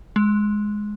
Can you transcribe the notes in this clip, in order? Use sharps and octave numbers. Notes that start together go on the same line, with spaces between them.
G#3